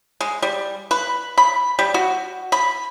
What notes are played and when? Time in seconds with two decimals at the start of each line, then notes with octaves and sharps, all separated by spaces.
0.21 G#3
0.42 G3
0.91 B4
1.37 B5
1.79 G3
1.94 F#4
2.52 B5